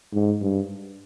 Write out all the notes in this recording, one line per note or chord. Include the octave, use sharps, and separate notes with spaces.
G#2
G2